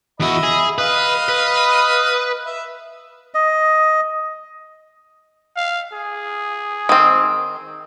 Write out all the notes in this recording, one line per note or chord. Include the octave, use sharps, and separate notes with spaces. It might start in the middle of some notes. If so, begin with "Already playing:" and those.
E2 F#4 D#5 E5 B5
G#4
B4 D#5 F5 D#6
B4
E5
D#5
F5
G#4
D#3 C4